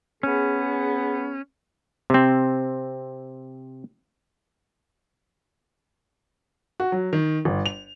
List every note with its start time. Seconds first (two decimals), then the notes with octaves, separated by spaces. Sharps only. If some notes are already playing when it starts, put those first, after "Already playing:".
0.23 B3 C#4 G#4
2.10 C3 C4
6.80 F#4
6.92 F#3
7.13 D#3
7.45 G1
7.66 F7